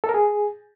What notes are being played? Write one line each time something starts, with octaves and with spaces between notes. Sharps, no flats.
A4
A#4
G#4